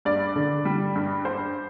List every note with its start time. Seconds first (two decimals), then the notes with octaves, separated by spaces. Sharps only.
0.05 G2 D5
0.36 D3
0.65 G3
0.96 G2
1.25 G2 C5